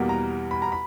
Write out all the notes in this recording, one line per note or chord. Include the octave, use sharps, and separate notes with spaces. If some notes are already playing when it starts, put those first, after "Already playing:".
Already playing: E2 B2 G3 A#3
A#5
B5
A#5
B5